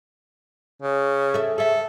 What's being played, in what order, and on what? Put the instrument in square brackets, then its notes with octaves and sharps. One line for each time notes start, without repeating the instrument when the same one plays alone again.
[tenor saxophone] C#3
[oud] A4 E5
[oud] G#4 E5 [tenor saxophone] A4